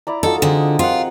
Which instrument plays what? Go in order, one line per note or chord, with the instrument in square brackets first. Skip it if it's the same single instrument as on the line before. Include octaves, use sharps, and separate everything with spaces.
[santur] E4 D5 A#5
[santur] D#4 F4 F#4 [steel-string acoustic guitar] A4
[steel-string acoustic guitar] D3 [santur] C4 G#4 A#5
[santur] C4 A#4 F#5 [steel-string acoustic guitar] F4